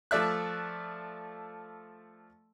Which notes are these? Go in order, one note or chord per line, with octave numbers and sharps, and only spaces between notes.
F3 A3 D5 E5 F#6